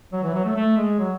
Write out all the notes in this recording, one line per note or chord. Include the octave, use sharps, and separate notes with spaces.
F#3
E3
F#3
A3
A3
G#3
F#3